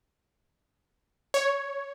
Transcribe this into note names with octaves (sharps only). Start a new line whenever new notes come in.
C#5